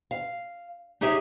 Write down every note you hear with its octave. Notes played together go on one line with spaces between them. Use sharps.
F5
D#4 G4 G#4 C#5 E5